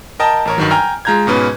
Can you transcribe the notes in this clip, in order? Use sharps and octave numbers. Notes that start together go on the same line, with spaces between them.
A#4 D#5 G5 A5
A1 A#4 C#5
G2 D#3 F#3
G5 G#5 A#5 F6
G#3 F4 A#5 G6 G#6
G#2 B2 C#4 B4